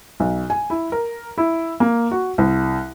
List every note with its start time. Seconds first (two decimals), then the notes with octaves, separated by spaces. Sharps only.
0.20 B1
0.50 G#5
0.70 E4
0.92 A#4
1.38 E4
1.80 A#3
2.11 F#4
2.38 C2